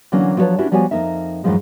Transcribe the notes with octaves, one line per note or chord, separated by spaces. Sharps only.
D3 E3 F#3 A#3 C#4
F3 F#3 F4 A4 B4 C#5
C#4 D4 E4 F#4 G4
F3 G3 B3 F#4 C#5 G#5
F2 A#3 D#4 A#4 E5
F#2 A2 D#3 F3 G#3